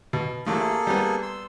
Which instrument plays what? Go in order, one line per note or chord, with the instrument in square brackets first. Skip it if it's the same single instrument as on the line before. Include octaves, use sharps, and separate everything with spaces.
[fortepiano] B2
[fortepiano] A1 A3 [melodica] A#3 G#4 A4
[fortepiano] G3 B3
[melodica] C6 E6